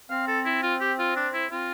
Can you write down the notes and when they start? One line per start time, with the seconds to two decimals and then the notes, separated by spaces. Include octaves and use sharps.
0.10 C4 F5
0.28 A4
0.45 E4
0.63 F4
0.80 G4
0.99 F4
1.16 D4
1.34 E4
1.51 C4 F4